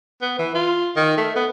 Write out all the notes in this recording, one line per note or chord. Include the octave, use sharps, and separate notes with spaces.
B3
E3
F4
D#3
A3
B3